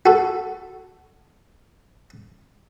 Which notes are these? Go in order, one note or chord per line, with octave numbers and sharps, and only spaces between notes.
F#4 A4